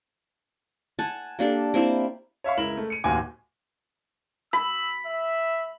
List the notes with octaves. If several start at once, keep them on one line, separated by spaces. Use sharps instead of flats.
F#5 G#5 A5
A#3 D4 G4 A4
A#3 C4 E4 E5
C#5 E5 F5 C#6
C#2 E4 A#4 E7 F#7
A3
C#7 D#7
D1 D#2 F#4 G#5 D6
B5 E6
E5